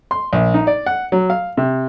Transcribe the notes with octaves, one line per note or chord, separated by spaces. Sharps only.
C6
A#1
D#4
D5
F#5
F#3
F5
C3